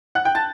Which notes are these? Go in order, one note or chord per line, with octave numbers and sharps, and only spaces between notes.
F#5 F#6
G5 G6
A5 A6